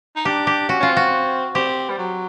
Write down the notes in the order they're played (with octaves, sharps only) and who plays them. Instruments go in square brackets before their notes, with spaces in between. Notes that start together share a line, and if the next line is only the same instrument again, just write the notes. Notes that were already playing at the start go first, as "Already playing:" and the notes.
[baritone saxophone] D#4
[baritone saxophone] D4 [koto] G4
[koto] G4
[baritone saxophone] C#4 [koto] F#4
[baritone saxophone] C#4 [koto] F4
[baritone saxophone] C4
[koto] F#4
[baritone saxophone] C4 [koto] G4
[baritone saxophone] G3
F#3